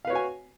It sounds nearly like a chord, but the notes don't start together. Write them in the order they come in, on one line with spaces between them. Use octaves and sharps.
F5 B4 C#5 F#4 G#5